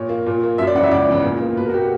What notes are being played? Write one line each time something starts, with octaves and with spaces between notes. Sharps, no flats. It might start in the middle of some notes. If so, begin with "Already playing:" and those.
Already playing: A#2 C#5
A#3
A#2
A#3
F#2 E5
D5
C#3 E3 F#5
E5
C#2 D5
C#3 E3 B3
A#2
A#3
B2 B4
A#4
F#4
A#3 G4
F#4